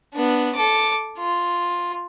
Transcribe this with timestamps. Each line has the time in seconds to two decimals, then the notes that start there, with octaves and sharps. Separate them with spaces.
0.14 B3 D4
0.55 A4 D6
1.18 F4